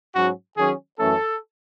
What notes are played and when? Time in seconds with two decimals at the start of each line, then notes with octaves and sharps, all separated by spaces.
0.15 G#2 F#3 C#4 F#4
0.57 D#3 F#3 C#4 G#4
0.98 F#2 E3 A3 C#4 A4